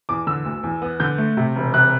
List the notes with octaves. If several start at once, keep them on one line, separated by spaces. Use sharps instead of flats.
E2 D6
D3 E6
D2
E2
B3
D3 G6
A3
C3
E1
C3 F#6